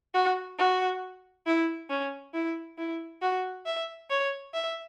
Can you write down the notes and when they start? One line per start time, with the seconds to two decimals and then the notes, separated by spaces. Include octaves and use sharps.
0.14 F#4
0.58 F#4
1.46 E4
1.89 C#4
2.34 E4
2.78 E4
3.22 F#4
3.66 E5
4.10 C#5
4.54 E5